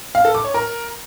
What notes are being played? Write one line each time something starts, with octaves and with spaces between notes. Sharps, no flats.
F5
A4
D6
C#5
A#4